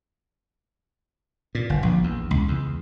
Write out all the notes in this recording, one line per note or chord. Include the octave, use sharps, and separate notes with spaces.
A#2
G1
A#1
E2
C#2
E2